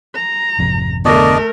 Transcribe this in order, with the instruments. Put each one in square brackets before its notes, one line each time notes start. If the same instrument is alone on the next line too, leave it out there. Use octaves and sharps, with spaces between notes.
[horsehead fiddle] A#5
[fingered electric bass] G#1 F2 C3
[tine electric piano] D3 B3 C#6 [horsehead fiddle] A3 A#4 [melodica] D4 D5 D#5